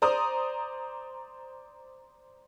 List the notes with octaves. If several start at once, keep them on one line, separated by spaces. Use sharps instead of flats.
C5 D5 A#5 D#6